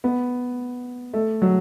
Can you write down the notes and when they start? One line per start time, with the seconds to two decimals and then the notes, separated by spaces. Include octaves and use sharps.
0.04 B3
1.13 A3
1.42 F#3